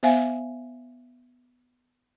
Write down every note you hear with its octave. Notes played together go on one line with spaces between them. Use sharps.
B3 C5 E5 F5 G#5